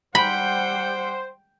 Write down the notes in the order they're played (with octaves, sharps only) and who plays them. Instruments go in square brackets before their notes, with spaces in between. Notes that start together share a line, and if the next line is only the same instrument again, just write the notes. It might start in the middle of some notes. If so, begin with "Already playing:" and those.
[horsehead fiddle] G3 F#5 [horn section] C5 [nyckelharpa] G5 [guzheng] B5